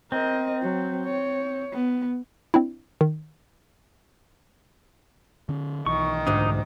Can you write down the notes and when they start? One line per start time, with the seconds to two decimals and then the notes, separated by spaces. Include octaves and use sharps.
0.12 C4 A#4 D#5
0.62 F#3
1.05 C#5
1.72 B3
2.54 C4 D4 E4
3.01 D#3
5.49 D3 C#4
5.86 B1 D#3 E3 C#6
6.26 D2 G#2 D4 D#4